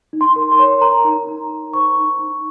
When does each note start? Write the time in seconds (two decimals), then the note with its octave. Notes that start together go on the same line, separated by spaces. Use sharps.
0.13 D#4
0.21 C6
0.36 A#4
0.52 C6
0.59 C#5
0.81 A#4 A#5
1.04 D#4
1.27 D#4
1.51 A#4
1.73 C5 C#6
1.96 D#4
2.19 D#4